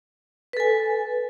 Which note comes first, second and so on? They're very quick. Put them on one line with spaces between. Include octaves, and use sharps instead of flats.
B4 A4 G#5